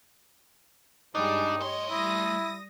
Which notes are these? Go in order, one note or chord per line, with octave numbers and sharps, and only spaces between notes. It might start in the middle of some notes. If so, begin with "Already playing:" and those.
G2 G3 G#3 D4 D#4
A3 C#5 D#5 C6
G3 E4 D#6 A#6